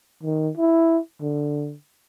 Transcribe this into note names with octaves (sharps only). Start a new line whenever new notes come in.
D#3
E4
D3